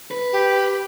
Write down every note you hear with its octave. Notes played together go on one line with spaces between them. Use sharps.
B4
G4